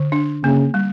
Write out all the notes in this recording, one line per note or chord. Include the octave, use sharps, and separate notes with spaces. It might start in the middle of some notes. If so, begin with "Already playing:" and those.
Already playing: D3
D4
C#3 A#3
G3